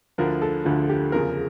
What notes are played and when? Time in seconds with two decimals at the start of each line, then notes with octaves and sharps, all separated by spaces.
0.18 D2 D3 F3 A#4
0.42 A4
0.65 D2 D3 F3
0.89 G4
1.12 E2 C#3 F3 A#4